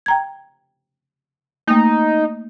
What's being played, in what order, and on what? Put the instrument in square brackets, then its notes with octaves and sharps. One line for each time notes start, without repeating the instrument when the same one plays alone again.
[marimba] G5 A#5 G#6
[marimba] A3 A#3 [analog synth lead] D#4